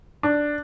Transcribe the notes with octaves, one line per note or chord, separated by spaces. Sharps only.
D4